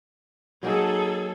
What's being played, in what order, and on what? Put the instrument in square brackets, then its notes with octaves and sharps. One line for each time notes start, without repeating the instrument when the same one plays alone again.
[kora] F#3 A#3 D#4 [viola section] G#4 A4